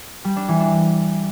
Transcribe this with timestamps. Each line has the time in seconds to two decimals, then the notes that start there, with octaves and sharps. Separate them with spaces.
0.25 G3
0.36 D4
0.48 E3
0.60 D4